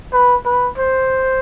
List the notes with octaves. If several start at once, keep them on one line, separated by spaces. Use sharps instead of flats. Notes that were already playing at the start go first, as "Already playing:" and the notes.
B4
B4
C5